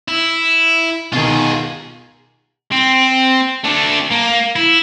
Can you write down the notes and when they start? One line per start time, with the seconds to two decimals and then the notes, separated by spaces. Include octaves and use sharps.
0.08 E4
1.13 B2 D#3 F4 G#4
2.72 C4
3.64 A3 D4
4.11 A#3
4.56 E4